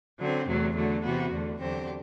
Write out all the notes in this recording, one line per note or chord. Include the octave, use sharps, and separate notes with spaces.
D3 F#3 C4
E2 C3 F#3 A3
D3 F#3 A3
C3 E3 B3 F#4
E2 D3 A3
E2 D3 F#3 C4 G4